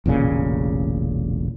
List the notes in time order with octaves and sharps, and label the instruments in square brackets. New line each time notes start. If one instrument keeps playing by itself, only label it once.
[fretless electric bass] E1 A1 A#2 C#3